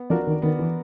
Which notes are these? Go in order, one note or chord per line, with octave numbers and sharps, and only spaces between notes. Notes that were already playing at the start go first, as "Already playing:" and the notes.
Already playing: B3
F3 D4 F#4 A#4 D5
D#3
D#3 B3
E3